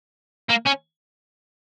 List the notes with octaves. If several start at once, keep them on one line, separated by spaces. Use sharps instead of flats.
A#3
C#4